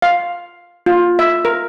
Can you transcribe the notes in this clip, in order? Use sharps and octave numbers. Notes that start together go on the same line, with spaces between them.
F5
F4
E5
A#4